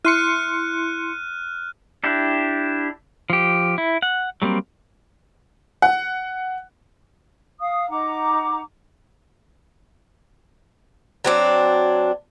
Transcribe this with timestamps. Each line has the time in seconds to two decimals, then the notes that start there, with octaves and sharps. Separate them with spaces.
0.05 E4 C6 F6 F#6 C#7 D#7
2.04 D4 E4 G4
3.30 F3 G4
3.78 E4
4.02 F#5
4.42 F#3 G3 A#3 C4
5.82 F#5
7.60 F5 D#6
7.89 D#4 F#5 A#5 D6
11.25 F#3 C4 D4